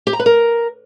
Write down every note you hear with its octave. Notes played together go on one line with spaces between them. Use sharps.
G4
A#5
B4
A#4